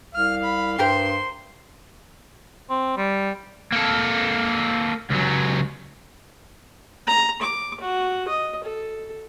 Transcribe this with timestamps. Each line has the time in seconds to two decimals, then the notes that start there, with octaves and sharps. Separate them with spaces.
0.15 C2 F5 F6
0.44 B5
0.79 G2 G4 A#4 C5 C6
2.70 C4
2.97 G3
3.72 A#3 A4
5.10 C#2 F#3
7.07 A#5
7.41 D6
7.81 F#4
8.28 D#5
8.64 A4